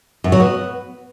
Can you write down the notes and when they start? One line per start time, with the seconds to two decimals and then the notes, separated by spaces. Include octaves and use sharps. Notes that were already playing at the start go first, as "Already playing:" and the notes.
0.24 F#2
0.32 F#3
0.40 B3